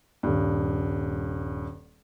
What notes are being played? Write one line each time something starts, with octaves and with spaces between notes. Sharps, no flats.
D#1 G2